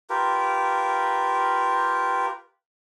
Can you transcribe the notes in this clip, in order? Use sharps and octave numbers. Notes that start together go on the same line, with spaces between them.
F4 G4 A#4 B4